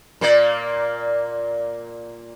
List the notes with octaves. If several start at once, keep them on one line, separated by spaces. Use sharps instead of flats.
A#2 A#3 D5